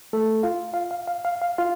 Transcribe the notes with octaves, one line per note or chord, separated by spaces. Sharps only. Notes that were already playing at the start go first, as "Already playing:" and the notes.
A3 A4
F4 F5
F5
F5
F5
F5
F5
F4 F5